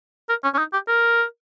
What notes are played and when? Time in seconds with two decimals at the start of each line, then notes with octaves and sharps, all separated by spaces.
0.29 A#4
0.44 C#4
0.54 C#4
0.58 D#4
0.73 G4
0.88 A#4